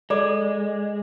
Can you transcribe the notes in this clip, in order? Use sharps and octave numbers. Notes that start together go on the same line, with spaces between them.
G#3 A4 D5 D6